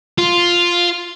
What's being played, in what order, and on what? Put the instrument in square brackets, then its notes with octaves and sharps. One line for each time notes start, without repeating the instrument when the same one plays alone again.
[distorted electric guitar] F4